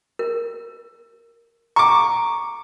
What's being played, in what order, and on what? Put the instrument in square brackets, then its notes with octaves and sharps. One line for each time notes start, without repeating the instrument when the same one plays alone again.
[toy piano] A#4
[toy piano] A#5 [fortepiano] C#6 D6